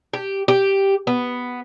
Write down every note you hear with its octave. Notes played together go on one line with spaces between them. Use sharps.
G4
G4
B3